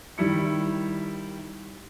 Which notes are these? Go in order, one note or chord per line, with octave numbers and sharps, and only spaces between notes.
D#3 G3 E4 C#7